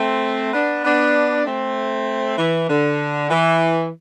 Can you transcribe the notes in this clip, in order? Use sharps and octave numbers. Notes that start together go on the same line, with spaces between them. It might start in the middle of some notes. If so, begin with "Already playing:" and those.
Already playing: A3 C4
B3 D4
B3 D4
A3 C4
E3
D3
E3